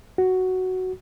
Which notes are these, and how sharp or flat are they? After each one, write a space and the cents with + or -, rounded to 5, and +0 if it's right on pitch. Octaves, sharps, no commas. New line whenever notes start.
F#4 +5